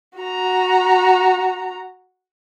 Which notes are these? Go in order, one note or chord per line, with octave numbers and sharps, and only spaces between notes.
F#4 A#5